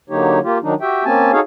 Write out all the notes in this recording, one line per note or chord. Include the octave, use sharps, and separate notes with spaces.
D3 F#3 A#3 D#4 G4 C#5
A#3 F4 G4
D#3 F#3 D4 D#4
F#4 G4 E5 G5
A#3 C4 C#4 G#5 A5
D#4 F#4 G#4 A4 C#5 F5